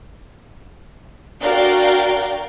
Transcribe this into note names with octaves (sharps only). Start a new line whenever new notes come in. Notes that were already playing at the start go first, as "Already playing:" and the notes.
D4 F#4 A#4 D5 F5 G5